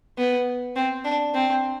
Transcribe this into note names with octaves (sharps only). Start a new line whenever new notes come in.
B3
C4
D4
C4